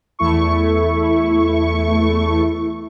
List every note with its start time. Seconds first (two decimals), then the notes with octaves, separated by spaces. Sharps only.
0.19 E2 A3 E4 C#6